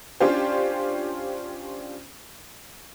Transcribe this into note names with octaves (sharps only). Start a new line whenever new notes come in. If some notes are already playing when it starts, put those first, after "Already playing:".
C#4 D4 F4 G4 C5